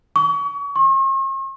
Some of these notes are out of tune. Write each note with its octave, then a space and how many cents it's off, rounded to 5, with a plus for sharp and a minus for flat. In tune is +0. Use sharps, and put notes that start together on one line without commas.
C#6 +35
C#6 -45